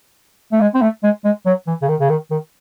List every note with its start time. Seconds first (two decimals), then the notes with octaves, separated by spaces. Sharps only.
0.53 A3
0.61 G#3
0.75 C4
0.82 A3
1.03 G#3
1.25 G#3
1.46 F#3
1.67 E3
1.82 C#3
1.89 D#3
2.00 C#3
2.10 D#3
2.31 D#3